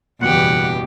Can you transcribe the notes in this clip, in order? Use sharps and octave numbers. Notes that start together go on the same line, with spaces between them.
F#1 E2 G2 B2 E3 G4 F#5